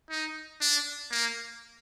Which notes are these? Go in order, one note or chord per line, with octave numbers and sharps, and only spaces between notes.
D#4
D4
A#3